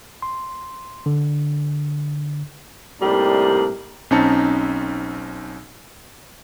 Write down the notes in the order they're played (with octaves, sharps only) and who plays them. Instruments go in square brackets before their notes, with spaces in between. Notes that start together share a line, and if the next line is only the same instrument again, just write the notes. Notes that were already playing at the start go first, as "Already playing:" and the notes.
[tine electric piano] C6
D3
[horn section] A2 C3 G3 A#3 D4 D#4
[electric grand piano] B1 C4 C#4 D#4 A5 C#7